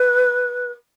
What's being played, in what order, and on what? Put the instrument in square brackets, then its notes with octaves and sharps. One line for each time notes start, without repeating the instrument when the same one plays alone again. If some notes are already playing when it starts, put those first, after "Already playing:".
Already playing: [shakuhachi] B4